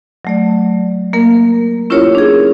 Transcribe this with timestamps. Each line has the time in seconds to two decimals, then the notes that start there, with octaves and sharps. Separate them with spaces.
0.25 F#3 A3 D5
1.13 A#3 A#4
1.90 C#4 E4 F4 G4 A#4 C#5
2.15 D4 G#4